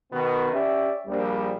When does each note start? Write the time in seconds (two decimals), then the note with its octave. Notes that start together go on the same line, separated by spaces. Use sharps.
0.12 B2 D#3 B3
0.52 C#4 G4 D5 E5
1.07 A#1 G3